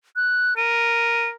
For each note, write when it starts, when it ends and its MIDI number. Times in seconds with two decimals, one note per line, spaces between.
0.16 0.54 90
0.57 1.35 70
0.57 1.29 99